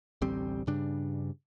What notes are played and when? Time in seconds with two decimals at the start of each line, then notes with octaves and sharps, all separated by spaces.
0.22 A1 D2 G3 C4
0.67 G2 C#3 G3 D4